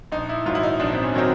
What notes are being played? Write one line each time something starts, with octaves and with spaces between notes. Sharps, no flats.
A#1 D#4
E4
G#2 D#3 F#3 F4
E4
D#4
A#1 D4
C4
C#4
D#3 F#3 C4